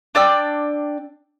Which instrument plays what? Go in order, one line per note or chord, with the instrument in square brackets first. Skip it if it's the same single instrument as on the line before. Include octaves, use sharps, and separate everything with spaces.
[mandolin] D4 D5 G5 E6